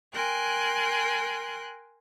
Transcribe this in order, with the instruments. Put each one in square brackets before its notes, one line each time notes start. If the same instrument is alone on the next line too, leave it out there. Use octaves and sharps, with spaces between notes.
[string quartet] A#4 G5 G#5 C6 F#6